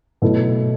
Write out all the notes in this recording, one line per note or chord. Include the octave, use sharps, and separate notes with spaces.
B2 F#3 A3 E4 A4